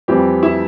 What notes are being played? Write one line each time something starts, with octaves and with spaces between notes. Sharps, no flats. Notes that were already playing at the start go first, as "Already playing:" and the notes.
F2 E3 G3 C4 G4
E4